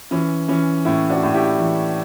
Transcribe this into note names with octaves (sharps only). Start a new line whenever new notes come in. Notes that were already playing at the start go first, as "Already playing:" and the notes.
E3 C#4
E3 C#4
A2 C#4 E4
D4 F#4
A2
E4 G4
E3